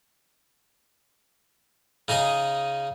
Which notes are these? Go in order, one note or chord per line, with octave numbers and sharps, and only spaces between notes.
C#3 D#4 G#4 D#5